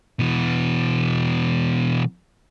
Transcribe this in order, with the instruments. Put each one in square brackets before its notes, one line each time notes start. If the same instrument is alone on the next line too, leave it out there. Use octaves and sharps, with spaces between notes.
[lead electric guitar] B2 E3